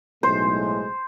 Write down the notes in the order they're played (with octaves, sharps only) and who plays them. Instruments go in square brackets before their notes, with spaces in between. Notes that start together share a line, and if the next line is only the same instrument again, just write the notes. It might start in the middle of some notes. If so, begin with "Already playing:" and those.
[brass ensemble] B1 A2 G#3 [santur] C5